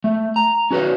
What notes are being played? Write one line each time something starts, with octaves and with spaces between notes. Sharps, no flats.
A3
A#5
C#4 F#4 A#4 B4 C#5